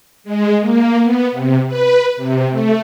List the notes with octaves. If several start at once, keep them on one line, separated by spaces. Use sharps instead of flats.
G#3
A#3
B3
C3
B4
C3
A3